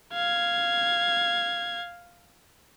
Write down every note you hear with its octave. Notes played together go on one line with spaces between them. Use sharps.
F5 G#6